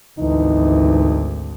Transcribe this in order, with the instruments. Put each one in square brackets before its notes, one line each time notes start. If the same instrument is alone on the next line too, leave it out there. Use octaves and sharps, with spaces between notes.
[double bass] G#1 D2 [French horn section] E3 D#4